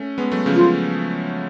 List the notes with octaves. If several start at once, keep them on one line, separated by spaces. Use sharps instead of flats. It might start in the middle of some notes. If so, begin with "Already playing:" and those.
Already playing: A3 C#4
G#3 B3
F#3 A3
C#3 F3
F4
C#3